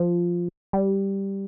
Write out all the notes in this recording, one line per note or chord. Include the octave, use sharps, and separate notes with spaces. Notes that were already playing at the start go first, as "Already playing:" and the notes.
Already playing: F3
G3